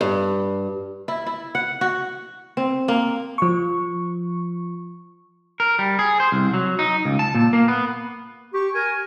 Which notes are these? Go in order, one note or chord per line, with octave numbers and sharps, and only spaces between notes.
G2
E4
E4
F#5
F#4
C4
A#3
F3 C#6
A#4
G3
G#4
C5
C2
F#3
D#4
C#2
A5
A#2
A#3
B3
G4 C#6
A#4 G#5